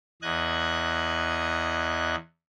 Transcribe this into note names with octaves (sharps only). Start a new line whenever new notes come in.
E2 D#5 F#6 G#6